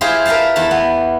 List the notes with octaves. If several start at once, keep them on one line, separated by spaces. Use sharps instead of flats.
E4 F4 G4 G#4 C5 F5
A#4 B4 E5 F5 A5
E2 E4 A5 A#5
B3